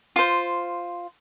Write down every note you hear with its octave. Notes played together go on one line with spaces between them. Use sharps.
F4 C5